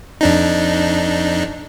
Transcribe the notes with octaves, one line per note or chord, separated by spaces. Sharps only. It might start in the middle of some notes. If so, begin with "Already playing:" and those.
F2 D4 D#4